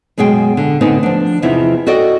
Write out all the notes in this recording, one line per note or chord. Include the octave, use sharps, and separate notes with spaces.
F#2 B2 G#3 G#4 G5
D3
D2 D3 B3 C4 D#4 G#5
F3 D4
E2 C3 E3 F3 D#4 E4
F#4 A4 D5 D#5 G5